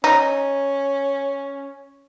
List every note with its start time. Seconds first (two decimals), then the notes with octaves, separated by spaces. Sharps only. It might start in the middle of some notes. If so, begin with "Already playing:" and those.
0.04 C#4 D#4